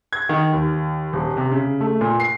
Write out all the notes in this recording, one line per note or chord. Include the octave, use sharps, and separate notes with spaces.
G#6
D#3
D#2
D#1
C3
C#3
A3
A#2
C7